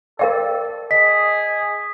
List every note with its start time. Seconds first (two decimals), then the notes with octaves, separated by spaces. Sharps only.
0.19 A4 A#4 D5 F5 G5
0.91 G#4 D#5 B6